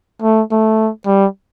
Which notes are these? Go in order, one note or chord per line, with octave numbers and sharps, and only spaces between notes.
A3
A3
G3